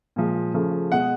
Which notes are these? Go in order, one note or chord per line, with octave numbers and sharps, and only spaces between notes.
A#2 F3 G#3
C#3 F3 A3
B2 G#3 F#5